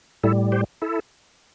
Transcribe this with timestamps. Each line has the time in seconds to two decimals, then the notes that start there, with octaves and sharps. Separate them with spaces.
0.24 A2 G3 E4 A4
0.52 G4 C5
0.82 E4 A4